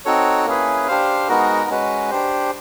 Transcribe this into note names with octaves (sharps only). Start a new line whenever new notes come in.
C4 D#4 F#4 A4 C#5
A#3 C#4 E4 G#4 B4
D4 G4 C5 F5
G#3 B3 D#4 F#4 A#4
G#3 C#4 F#4 B4
D4 G4 C5